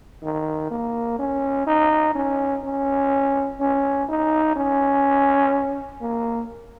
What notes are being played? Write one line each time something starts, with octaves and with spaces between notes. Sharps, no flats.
D#3
A#3
C#4
D#4
C#4
C#4
C#4
D#4
C#4
A#3